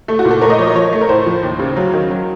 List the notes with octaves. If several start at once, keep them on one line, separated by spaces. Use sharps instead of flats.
A3 A4
F#4
A#2
A4
A3 A#4
D#5
F3 C#5
D#5
F3 C#5
A3
A#4
A2 C5
F3
D#2
C#3
F#3
D#3
F#3